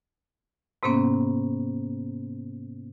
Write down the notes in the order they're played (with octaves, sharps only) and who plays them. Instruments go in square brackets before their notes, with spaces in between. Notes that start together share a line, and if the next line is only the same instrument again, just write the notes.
[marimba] G#2 C3 A#3 B3 C#4